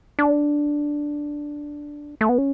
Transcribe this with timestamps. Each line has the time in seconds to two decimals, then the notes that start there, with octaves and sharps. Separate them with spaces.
0.19 D4
2.21 A3
2.29 B3
2.38 C#4